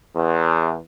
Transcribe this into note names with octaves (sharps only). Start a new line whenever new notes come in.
E2